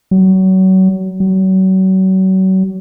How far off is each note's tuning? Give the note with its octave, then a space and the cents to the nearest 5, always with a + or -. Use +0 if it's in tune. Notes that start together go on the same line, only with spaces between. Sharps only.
F#3 +30
F#3 +35